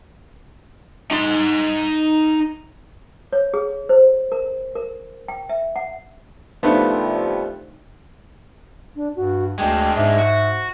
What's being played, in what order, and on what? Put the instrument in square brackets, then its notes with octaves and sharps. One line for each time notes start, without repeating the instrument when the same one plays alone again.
[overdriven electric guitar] D#4 C6
[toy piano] C#5
G#4
C5
A#4
A#4
G5
E5
F#5
[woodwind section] C2 C3 F3 [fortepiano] A3 B3 [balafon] D4 D#4
[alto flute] D4
[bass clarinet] G2 [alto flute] F#4
[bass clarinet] D2 [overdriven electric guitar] G#3 D4 [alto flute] G5
[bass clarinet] G#2 [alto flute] E5
[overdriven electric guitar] F#4